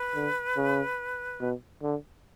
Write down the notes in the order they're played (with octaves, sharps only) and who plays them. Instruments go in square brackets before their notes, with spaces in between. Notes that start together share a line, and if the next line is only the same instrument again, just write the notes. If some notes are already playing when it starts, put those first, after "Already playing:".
Already playing: [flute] B4
[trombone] D3
C#3
B2
D3